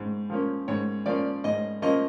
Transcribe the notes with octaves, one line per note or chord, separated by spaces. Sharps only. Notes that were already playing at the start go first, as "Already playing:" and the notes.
Already playing: G#2
F3 A#3 C#4
G#2 C#5
F3 A#3 C#4 D5
G#2 D#5
F3 A#3 C#4 D#5